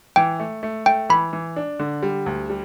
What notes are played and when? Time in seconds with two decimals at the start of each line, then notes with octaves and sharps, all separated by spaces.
0.16 E3 G5
0.39 A3
0.63 A3
0.86 A3 G5
1.09 E3 B5
1.33 E3
1.56 D4
1.79 D3
2.03 G3
2.26 D2
2.50 G3